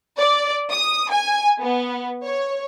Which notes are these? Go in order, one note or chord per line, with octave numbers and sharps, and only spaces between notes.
D5
D#6
G#5
B3
C#5